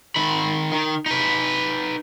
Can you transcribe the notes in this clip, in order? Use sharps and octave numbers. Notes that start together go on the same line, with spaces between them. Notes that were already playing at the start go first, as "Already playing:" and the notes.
D#3 B5
D#3
D#4 B4